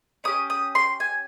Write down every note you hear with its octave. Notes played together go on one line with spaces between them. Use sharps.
C#4 G4 D#6
D#6
C6
G#5